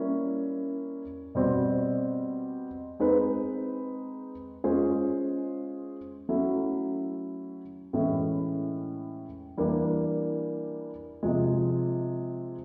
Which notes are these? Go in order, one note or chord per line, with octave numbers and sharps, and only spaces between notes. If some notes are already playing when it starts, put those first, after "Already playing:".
Already playing: G3 A#3 C#4 E4
B2 G3 C4
G#3 C4 D#4 G#4 B4
G#3 C#4 F4 G#4 C5
F#3 A3 C#4 E4
A2 E3 G#3 C#4 E4
E3 G3 A#3 D4
C3 F3 G#3